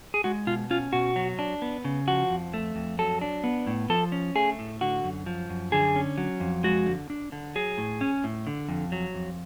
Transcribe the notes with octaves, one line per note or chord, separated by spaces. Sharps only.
G#4
G#3 F#4
B2 F4
C#4 F4
B2 F#4
F#3
D4
B3
C#3
F3 F#4
F2
A3
F2
F#3 A4
D4
B3
A2
F3 A4
C#4
A3 G#4
A2
D3 F#4
F#2
F3
F#2
D3 G#4
C#4
F#3
F2
G#3 F#4
D3
D4
D3
F#3 G#4
A2
C#4
A2
D3
F2
F#3
F2